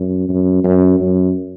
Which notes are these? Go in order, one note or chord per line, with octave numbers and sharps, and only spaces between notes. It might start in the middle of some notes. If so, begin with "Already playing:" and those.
Already playing: F#2
F#2
F#2
F#2